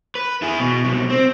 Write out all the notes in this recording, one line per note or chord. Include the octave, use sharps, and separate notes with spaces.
B4
E4 G#4
B2
C2 B2
C4